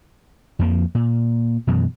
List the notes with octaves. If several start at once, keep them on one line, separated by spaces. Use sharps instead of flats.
F2 F3 A#3
A#2
F#2 B2 E3